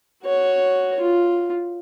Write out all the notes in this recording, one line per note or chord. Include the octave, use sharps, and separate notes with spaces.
F#4 C#5
F4